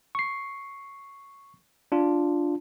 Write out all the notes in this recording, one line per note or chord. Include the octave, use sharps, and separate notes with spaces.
C#6 C7
D4 F4